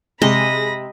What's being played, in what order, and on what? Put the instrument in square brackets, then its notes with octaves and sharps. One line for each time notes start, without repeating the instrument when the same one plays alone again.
[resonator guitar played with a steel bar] C3 [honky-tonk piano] G#3 [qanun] D#5 [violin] B5 A#6